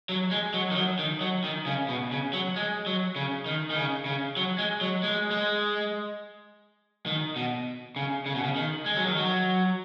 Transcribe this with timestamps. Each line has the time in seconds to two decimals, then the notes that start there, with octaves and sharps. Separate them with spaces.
0.09 F#3
0.31 G#3
0.54 F#3
0.71 D#3
0.76 F#3
0.99 D#3
1.21 F#3
1.44 D#3
1.66 C#3
1.89 B2
2.12 C#3
2.33 F#3
2.56 G#3
2.86 F#3
3.16 C#3
3.46 D#3
3.71 D#3
3.76 C#3
4.06 C#3
4.37 F#3
4.58 G#3
4.81 F#3
5.03 G#3
5.31 G#3
7.06 D#3
7.36 B2
7.96 C#3
8.26 C#3
8.35 B2
8.43 C#3
8.56 D#3
8.86 G#3
8.96 F#3
9.07 D#3
9.17 F#3